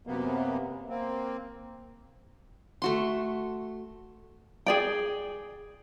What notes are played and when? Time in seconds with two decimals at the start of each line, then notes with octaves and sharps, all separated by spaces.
0.07 F#2 C3 A#3 B3
0.90 A#3 C4
2.82 A3 F#4 C6
4.66 G#4 D5 G5